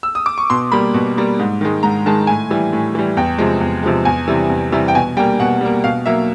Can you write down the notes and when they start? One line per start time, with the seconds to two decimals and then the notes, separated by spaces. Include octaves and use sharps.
0.03 E6
0.15 D#6
0.26 D6
0.38 C#6
0.50 B2 C6
0.72 G3 A#3 B5
0.94 B2
1.17 G3 A#3
1.40 G#2
1.61 D#3 G#3
1.83 G#2 A#5
2.06 D#3 G#3 A5
2.27 A2 G#5
2.50 E3 G3
2.73 A2
2.95 E3 G3
3.17 E2 G5
3.38 C3 F3 G#3
3.61 E2
3.83 C3 F3 G#3
4.05 E2 G#5
4.28 C3 E3 G3
4.50 E2
4.72 C3 E3 G3
4.88 G5
4.95 B2 G#5
5.17 G3 A#3 G5
5.40 B2 F#5
5.61 G3 A#3
5.84 B2 F5
6.06 F#3 A#3 E5